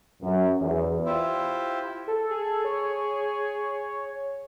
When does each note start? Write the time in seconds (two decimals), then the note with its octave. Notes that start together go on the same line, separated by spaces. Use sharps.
0.23 F#2
0.60 E2
1.06 E4 F4 G4 C5 E5
2.07 A4
2.31 G#4
2.65 C#5